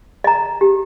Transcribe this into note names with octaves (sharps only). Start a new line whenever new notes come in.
D#5 A#5
G4